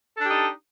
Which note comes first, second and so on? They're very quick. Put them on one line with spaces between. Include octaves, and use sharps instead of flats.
A4 D4 G4 D#4